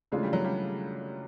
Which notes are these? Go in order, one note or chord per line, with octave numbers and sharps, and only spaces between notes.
C#3 E3 G#3 A3 D4 F4
G3
F#3
G3